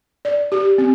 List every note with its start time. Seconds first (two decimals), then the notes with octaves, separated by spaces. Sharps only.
0.25 D5
0.52 G4
0.78 C4